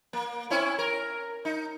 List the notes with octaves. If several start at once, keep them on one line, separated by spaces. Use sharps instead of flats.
A#3
C4 C#4 E4
A#4
D#4